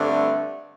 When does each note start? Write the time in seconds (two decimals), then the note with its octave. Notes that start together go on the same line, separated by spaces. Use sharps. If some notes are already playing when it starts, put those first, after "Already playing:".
Already playing: G2 D3 A3 C4